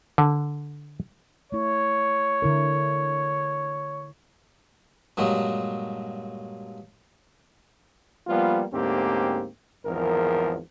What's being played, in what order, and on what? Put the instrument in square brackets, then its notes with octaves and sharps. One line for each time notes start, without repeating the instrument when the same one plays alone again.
[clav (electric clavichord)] D3
[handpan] A3 E4 [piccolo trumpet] C#5
[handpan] D3 E4 A#4
[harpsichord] G2 A#2 F#3 G#3
[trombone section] F3 G3 A#3 B3 F4
D2 G#2 A#3 C4 C#4 G4
G#1 E2 F3 A#4